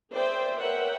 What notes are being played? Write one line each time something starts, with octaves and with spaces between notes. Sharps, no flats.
G#4 C5 D5 E5 G5
A#4 B4 C#5 E5 F#5 G5